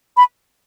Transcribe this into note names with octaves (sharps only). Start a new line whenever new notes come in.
B5